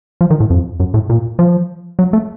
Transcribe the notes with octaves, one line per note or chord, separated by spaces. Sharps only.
F3
D#3
A2
F2
F#2
A2
A#2
F3
F#3
A3